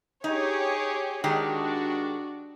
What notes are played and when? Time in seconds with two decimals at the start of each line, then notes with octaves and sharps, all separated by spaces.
0.24 D#4 G4 G#4 C#5
1.24 D#3 G#3 D4 F#4 G4